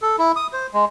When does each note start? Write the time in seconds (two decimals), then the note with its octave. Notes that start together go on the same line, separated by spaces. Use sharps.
0.02 A4
0.18 E4
0.36 D#6
0.53 C5
0.73 G#3